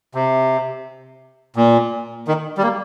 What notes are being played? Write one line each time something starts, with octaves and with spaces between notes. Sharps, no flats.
C3
A#2
D#3
G3
A#3